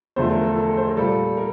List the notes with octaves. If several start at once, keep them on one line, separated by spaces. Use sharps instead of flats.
E2 D3 F3 A3 C5
A#4
A4
A4
A#4
C5
A#4
A#2 G3 A4
A#4